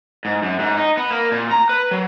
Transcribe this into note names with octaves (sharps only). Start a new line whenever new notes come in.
G#2
F#2
G#2
D#4
B3
A#3
A#2
A#5
B4
F#3